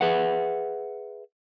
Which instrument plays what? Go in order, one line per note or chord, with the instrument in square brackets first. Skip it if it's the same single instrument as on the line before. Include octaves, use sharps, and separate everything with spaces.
[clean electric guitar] G#4 B4 E5 F#5